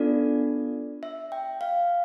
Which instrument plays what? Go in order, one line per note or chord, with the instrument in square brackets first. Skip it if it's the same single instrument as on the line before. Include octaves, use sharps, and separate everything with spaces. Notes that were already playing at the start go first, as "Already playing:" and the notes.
Already playing: [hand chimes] B3 D4 F4 A4 D5
E5
G5
F5